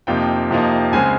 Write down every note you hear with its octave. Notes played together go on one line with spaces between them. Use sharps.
F2 C3 F3 A#3 D#4 G5
F2 C3 F3 A#3 D#4
C#2 C#3 G#3 C4 G#5